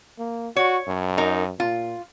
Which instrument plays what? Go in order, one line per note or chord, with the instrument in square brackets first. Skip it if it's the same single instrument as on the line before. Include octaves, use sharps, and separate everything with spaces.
[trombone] A#3
[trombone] F#4 [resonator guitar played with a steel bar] C#5
[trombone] F#2
[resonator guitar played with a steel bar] D#4 A#4
[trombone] A#2 [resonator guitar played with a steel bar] F4